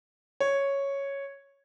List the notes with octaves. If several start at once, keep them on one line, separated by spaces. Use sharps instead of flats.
C#5